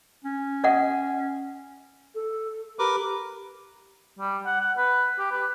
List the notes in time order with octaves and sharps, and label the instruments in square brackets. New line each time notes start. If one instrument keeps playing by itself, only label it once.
[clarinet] C#4
[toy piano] D5 F#5 [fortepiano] D#5
[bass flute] A4
[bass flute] G4 [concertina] A#4 B4 D6
[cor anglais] G3
F#5
F#5
B4
G4
B4